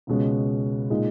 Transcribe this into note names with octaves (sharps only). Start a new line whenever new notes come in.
C#2 B2 G#3 C#4
A#2 G#3 D#4